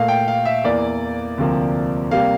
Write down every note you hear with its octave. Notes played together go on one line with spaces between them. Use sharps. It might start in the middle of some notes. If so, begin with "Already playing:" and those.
Already playing: A#2 A3 F5
G5
F5
E5
E2 E3 A#3 D5
D2 C3 F3 A#3
C3 G3 A#3 F5